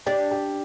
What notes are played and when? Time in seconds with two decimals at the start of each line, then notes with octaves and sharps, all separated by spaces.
0.06 D4 G4
0.31 G4